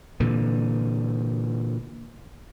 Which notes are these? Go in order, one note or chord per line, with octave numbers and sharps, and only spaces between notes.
A#2 D3 E3